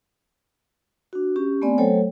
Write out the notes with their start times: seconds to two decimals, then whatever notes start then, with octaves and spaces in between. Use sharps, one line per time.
1.13 D4 F#4
1.36 C#4 G4
1.62 A3 B3 C4 D5 G#5
1.78 F#3 A3 A4 C5 C#5 G5